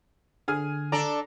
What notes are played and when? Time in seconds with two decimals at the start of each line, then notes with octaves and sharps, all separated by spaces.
0.48 D3 G#4 G#5 F6
0.92 D4 A4 D5 A#5